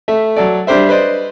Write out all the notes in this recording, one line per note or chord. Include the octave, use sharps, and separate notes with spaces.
A3 E5
F#3 A4 D5
G3 D4 G4 C5 E5
B4 C5 D5 D#5